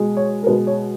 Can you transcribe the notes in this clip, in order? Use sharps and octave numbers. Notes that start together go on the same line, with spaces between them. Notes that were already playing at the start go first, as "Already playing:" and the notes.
Already playing: B2 G#3
C#5
A#4
B2 G#3 B4
C#5